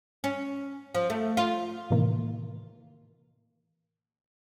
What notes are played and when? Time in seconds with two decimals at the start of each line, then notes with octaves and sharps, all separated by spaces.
0.24 C#4
0.95 F3
1.10 A3
1.37 F4
1.90 A2 C3 D#3 E3 A#3